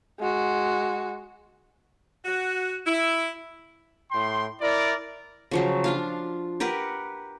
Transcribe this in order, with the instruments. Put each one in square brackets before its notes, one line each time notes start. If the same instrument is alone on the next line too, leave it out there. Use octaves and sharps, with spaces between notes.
[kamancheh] G#3 F#4
[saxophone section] F#4
E4
[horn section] A2 G5 C6
E4 A#4 D5
[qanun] C#3 F3 F#3
D4 F4 F5
G4 A#4 B4 F#5